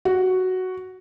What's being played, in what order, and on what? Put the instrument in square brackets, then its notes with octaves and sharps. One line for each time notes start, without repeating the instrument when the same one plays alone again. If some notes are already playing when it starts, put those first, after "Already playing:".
[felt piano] F#4